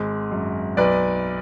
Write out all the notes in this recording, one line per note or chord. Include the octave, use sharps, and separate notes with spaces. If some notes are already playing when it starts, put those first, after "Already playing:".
Already playing: G#1 G#3
F#2
B1 B4 D5